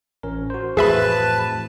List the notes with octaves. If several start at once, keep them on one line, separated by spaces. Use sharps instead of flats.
A1 C#4 A#4
F#4 C5
F2 A2 E3 G#4 B4 E5 A5 B5